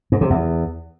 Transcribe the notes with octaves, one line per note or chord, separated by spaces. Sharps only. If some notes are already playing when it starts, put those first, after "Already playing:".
G#2
C3
E2